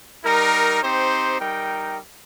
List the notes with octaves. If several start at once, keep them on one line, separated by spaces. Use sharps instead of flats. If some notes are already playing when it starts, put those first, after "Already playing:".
G3 D#4 A#4
C4 D#4 G4 C5
G3 D#4 A#4 G5